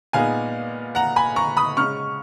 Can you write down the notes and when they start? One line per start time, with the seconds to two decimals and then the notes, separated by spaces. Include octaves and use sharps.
0.13 A#2 G#3 B3 D#4 F5 G#5
0.95 F#5 A#5
1.16 G#5 B5
1.36 A#5 C#6
1.57 B5 D#6
1.77 C#3 G#3 C#4 C#6 F6